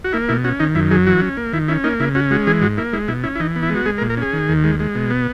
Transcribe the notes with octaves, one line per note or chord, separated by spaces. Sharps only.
F#4
A#3 E4
B2 E4
C#4 F#4
D#3 D#4
F#2 E4
F#3 G#4
E3 F#4
C#4
A#3
D#3 E4
C#4 E4
A#3 D#4
C#3 E4
C#4 F#4
G#3 F#4
E3 G#4
G#2 F#4
A#3 E4
G#3 E4
B2 E4
C#4 E4
E4
E3 D#4
B3
E4
G#3
F#4
G#3 G#4
A#4
A#2
A#4
C#4 G#4
D#3
D#2
G#3
G#3
B2
B3